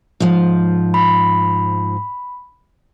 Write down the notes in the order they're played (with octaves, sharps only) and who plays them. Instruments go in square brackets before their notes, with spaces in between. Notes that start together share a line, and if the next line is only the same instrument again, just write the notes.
[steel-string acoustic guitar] G#2 F3
[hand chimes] B5